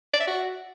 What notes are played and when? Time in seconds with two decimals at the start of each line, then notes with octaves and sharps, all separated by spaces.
0.14 D5
0.20 E5
0.27 F#4